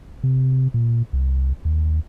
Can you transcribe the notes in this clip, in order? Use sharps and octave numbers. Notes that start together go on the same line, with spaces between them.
C3
A#2
C2
D#2